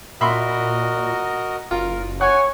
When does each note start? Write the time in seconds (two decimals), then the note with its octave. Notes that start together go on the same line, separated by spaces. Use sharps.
0.21 A#2 F#4 A#4 D#5 E5 B5 C6
1.71 F#1 F4 A#4
2.21 C#5 F#5 G#5